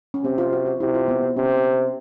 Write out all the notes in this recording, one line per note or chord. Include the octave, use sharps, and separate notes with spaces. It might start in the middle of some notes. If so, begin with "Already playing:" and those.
C#4
C3 C4
F4
F#4
F#4
C3 E4
F4
B3
C4
C3 C#4